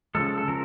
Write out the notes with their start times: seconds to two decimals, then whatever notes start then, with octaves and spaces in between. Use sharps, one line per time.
0.15 C#3 F3 G#3 A4
0.38 A4
0.48 C#3 F3 A#4